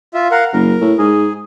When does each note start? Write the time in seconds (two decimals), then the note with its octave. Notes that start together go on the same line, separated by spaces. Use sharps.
0.14 F4 E5
0.31 A#4 F5 F#5
0.53 F#1 A#4
0.81 A2
0.98 G#2 G#4